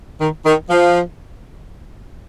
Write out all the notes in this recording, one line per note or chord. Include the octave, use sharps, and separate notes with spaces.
D#3
D#3
F3